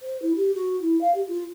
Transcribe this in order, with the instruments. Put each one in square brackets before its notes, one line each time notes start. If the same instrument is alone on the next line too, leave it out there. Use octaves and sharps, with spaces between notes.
[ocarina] C5
E4
G4
F#4
E4
F5
G4
F4